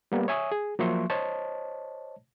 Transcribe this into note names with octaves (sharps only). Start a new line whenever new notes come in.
G3 A#3 B3
C#5 E5 G#5 C#6 D#6
G#4
F3 F#3 A#3 E5 C6 C#6
C5 C#5 D#5 A5